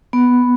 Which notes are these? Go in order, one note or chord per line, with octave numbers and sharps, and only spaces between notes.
B3